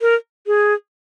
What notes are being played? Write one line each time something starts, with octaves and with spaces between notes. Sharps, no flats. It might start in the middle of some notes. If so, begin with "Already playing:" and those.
A#4
G#4